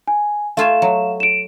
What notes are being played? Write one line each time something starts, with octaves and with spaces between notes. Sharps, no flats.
G#5
A3 F4 F5 G#5 E7
F#3
D7 E7